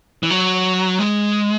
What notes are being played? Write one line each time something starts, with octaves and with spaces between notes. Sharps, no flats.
E3
F#3
G#3